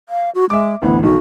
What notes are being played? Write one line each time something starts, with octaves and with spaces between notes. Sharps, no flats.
F5
F#4
G#3 E5 D6
A1 D2 E3 B3
B1 D#3 F#4